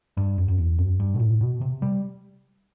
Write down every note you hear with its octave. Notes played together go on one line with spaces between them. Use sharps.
G2
F#2
F#2
E2
F#2
G2
B2
A2
B2
C3
G3